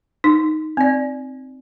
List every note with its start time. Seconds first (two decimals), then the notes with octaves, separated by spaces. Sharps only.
0.24 D#4
0.77 C4 D5